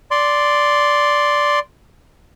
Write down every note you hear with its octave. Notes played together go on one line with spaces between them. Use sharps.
D5 C6